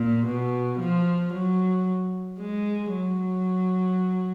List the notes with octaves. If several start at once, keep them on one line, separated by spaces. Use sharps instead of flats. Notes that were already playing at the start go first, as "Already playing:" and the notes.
Already playing: A#2
B2
F3
F#3
G#3
F#3